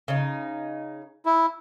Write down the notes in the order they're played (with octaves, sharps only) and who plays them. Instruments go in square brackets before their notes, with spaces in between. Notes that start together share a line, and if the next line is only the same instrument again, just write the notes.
[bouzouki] C#3 D#4
[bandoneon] E4